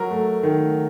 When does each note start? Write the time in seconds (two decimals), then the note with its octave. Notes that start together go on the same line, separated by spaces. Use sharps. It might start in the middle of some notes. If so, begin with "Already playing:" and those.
Already playing: F#3 A#4
0.11 A3
0.43 D#3